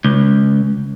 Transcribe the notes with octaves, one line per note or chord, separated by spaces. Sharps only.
C#2